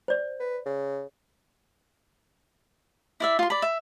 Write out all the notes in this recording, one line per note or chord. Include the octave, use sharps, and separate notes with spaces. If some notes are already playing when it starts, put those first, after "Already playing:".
C5 D5
B4
C#3
E4 D5 E5
F4 C6
D5 B5
E5